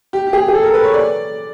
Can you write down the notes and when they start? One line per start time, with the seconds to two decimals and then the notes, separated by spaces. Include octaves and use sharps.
0.13 G4
0.27 G4
0.33 G#4
0.48 G#4
0.54 A4
0.63 A#4
0.74 B4
0.84 C#5
0.94 D5